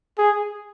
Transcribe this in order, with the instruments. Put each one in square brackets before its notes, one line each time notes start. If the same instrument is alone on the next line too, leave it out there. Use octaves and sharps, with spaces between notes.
[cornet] G#4